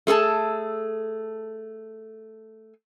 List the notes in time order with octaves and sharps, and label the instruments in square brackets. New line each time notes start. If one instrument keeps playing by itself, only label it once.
[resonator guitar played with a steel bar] A3 G#4 A4 A5